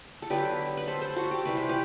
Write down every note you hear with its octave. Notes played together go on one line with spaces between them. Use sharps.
A4
D3 F#3 B3 G4 B4
B4
A4 C5
A4 C5
F#4 A4
G4
C3 E3 G3 B4
C5
G4 B4